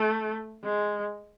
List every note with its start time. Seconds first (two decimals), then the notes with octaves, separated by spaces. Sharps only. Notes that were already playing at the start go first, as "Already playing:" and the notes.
Already playing: A3
0.64 G#3